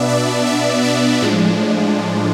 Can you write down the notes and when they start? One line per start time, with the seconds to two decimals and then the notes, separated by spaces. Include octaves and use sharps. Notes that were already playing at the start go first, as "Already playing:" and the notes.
Already playing: B2 B3 D4 E5
0.08 D5
0.46 E5
0.84 D5
1.22 A2 F3 G#3 D4